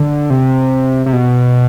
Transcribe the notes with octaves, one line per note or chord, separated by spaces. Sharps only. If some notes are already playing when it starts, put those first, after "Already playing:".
Already playing: D3
C3
C3
B2